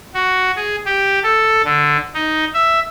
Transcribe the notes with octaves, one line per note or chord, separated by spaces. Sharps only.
F#4
G#4
G4
A4
D3
D#4
E5